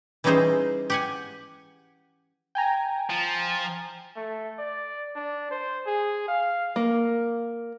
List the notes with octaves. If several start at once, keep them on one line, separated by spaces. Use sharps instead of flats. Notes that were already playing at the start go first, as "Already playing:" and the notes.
E3 G3 C#4 D#4 G#4 C5
G4 F#5 G#5
G5 G#5 A#5
F3
A3
D5
D4
C5
G#4
F5
A#3